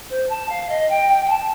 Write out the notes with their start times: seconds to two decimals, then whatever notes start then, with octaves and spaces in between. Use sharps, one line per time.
0.10 C5
0.29 A5
0.49 F5
0.69 D#5
0.90 G5
1.09 G5
1.25 G5
1.30 A5